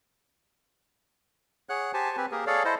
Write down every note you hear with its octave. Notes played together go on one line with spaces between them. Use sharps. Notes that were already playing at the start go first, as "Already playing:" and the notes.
G#4 C#5 F#5 F#6
G4 C5 G#5 A5
C4 G4 B4 G#5
A#3 G4 G#4 A#4
G#4 A4 C#5 D5 F5
E4 A4 C5 D#5